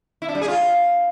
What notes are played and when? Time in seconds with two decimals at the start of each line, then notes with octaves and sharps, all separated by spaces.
0.22 E4
0.28 D4
0.35 G3
0.42 G#4
0.48 F4